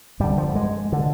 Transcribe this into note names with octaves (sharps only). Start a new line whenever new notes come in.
G2 D3 G3
F3
G#3
D3